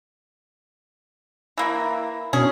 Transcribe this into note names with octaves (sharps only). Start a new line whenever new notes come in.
E3 A#3
B2 C#4 D4 G#4